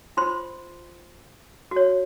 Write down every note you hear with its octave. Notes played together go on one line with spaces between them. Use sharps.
F4 C5 C6
F#4
C#5